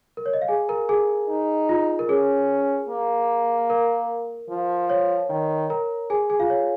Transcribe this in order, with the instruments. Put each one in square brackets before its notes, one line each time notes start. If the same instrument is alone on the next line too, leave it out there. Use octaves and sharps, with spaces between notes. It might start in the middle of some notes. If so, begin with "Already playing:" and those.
[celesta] A#4
C#5
D#5
F5
G#4 G#5
A#4 A#5
G#4 G#5
[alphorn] D#4
[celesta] F4
A#4
[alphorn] C#4 [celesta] G#4
[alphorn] A#3
[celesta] A#4
[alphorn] F3
[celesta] C#5
[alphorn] D#3
[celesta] A#4 A#5
G#4 G#5
G#4 G#5
F4 F5
C#5